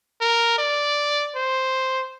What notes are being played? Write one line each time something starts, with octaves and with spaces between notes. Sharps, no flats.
A#4
D5
C5